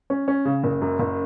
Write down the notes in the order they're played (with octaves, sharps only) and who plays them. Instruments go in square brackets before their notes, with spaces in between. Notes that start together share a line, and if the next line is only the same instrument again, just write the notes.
[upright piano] C#4
C#4
C#3
F#1
F#2
F#1